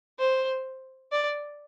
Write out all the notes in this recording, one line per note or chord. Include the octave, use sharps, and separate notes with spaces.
C5
D5